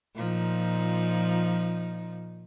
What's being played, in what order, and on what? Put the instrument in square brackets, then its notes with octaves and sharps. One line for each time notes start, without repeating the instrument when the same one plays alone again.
[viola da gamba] A#2 F3 D#4